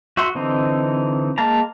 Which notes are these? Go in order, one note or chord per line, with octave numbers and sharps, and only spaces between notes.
F#4 E5 F#5 C6
D3 E3 C4 D#4
G#3 A#3 F5 A5 A#5